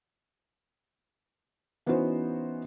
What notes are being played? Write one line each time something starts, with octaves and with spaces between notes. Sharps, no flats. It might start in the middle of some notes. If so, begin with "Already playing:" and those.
E3 B3 C#4 D#4 F#4 C5